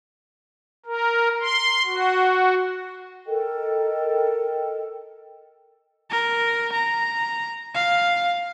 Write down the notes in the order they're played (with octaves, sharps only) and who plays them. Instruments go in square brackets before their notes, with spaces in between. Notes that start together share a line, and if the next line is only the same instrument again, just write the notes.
[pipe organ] A#4
C6
F#4
[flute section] A4 A#4 D#5 G5
[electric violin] A#4
A#5
F5